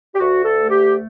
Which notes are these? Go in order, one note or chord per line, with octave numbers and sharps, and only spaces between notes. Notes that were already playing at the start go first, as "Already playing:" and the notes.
G4
D2 F#4
A4
A3
G4